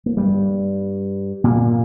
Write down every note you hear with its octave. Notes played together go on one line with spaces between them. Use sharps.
A#3
G2 G3
A#2 A#3